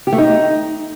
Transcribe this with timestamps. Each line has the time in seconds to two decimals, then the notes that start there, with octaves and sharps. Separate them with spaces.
0.07 G4
0.13 A3
0.18 D#4